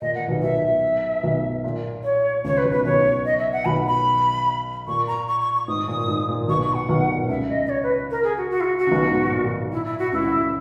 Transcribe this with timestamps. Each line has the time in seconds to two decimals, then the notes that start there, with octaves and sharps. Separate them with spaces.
0.01 A#2 D#5
0.15 A#2 F#5
0.28 B1 B2
0.42 B1 B2 E5
1.23 B1 B2
1.64 A#2
2.03 C#5
2.44 C#2 C#3 C#5
2.58 B4
2.64 B1 B2
2.71 B4
2.85 B1 B2 C#5
3.25 D#5
3.39 E5
3.53 F#5
3.65 B1 B2 B5
3.86 B5
4.88 A#2 C#6
5.07 A#5
5.28 C#6
5.41 C#6
5.54 C#6
5.68 G#2 D#6
5.88 A#2
6.08 G#2
6.29 A#2
6.48 B1 B2 C#6
6.62 C#6
6.75 F#5
6.89 B1 B2
7.10 A#2
7.21 B2
7.29 C#2 C#3 E5
7.50 D#5
7.66 D#5
7.70 C#5
7.83 B4
8.11 A#4
8.24 G#4
8.37 F#4
8.50 F#4
8.61 E4
8.64 F#4
8.78 F#4
8.87 C#3
8.92 B1 B2
9.11 G#2
9.32 A#2
9.72 E4
9.86 E4
9.98 F#4
10.12 C#2 C#3 E4